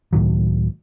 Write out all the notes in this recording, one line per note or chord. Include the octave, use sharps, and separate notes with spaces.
C#2 A2 D#3 F#3